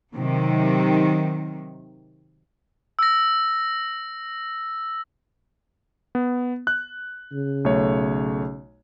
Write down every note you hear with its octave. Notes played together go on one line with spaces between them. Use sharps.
C3 D#3 F#3
E6 A#6
B3
F#6
C#3
B1 A3 C#5